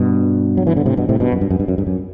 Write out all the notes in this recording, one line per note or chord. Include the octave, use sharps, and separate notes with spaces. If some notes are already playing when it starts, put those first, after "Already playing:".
Already playing: G2 B2
F#3
E3
D3
A2 C3
G2 B2
A2 C3
G2 B2
F#2
G2
F#2
G2
F#2
G2
F#2